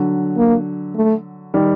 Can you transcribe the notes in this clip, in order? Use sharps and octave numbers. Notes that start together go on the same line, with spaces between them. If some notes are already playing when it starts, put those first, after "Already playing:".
Already playing: D3 F#3
A#3
A3
D#3 G3